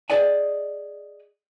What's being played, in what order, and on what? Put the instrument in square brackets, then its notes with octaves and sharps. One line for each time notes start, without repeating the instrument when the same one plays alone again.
[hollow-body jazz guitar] G#4 B4 D5 D#5 G5 G#5